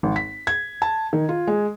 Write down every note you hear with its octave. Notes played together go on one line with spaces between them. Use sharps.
G#1
B6
G#6
A5
D#3
F4
G#3